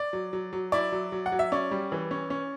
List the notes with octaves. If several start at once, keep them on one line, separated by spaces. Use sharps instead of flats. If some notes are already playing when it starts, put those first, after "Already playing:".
Already playing: D5
F#3
F#3
F#3
E4 D5
F#3
F#3
F#5
F#3
E5
C#4 D5
G3
E3
C#4
C#4